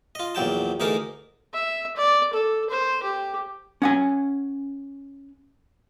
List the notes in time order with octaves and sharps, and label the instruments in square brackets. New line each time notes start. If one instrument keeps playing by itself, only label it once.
[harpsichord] F4 D#5
A#1 E2 F#3 G5 A5
D2 E3 D#4 G#4 A#4 A5
[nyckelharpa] E5
D5
A4
C5
G4
[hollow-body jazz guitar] C#4 F#5 G#5